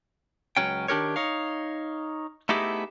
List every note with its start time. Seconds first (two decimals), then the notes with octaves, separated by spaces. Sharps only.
0.57 C#2 F#3 C#4 G5
0.88 D#3 D4 G4 A#4 C#5
1.16 D#4 C#5 F5
2.49 A3 B3 D#4 E4 G4 G#4